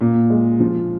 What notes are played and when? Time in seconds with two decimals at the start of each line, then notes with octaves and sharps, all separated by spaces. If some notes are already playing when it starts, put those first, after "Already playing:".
0.01 A#2
0.30 G#3
0.60 F3